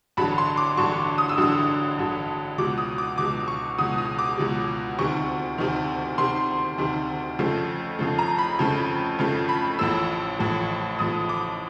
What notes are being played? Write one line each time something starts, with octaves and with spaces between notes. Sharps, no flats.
A1 G2 D3 F#3 B5
C6
D6
A1 G2 D3 F#3 C#6
D#6
E6
A1 G2 D3 F#3 D#6
A1 G2 D3 F#3
C#2 B2 F#3 D6
D#6
D6
C#2 B2 F#3 D6
C#6
C#2 B2 F#3 D#6
D#6
D6
C#2 B2 F#3
D2 C3 D#3 C#6
D2 C3 D#3
D2 C3 D#3 C6
D2 C3 D#3
F2 C#3 F3 A3
F2 C#3 F3 A3
A#5
B5
F2 C#3 F3 A3
F2 C#3 F3 A3
B5
A1 A2 F3 E6
A1 A2 F3
A1 A2 F3 D#6
D6